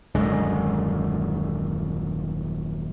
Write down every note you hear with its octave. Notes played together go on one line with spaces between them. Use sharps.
D#1 F#2 D3 G#3